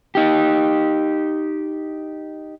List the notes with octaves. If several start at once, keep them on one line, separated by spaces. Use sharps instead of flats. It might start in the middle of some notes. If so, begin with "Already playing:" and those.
D#4 G4